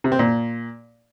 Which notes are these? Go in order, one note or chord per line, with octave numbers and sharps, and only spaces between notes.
C3
C4
A#2